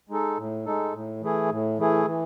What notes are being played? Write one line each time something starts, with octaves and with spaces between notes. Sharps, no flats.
G#3 D#4 A4
A2
G#3 D#4 A4
A2
E3 A3 E4 G#4
A2
E3 A3 E4 G#4
E3